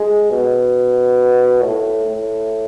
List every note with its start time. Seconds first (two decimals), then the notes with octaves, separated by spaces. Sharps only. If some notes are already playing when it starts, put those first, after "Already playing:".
Already playing: G#3
0.30 B2
1.63 A2
2.07 A2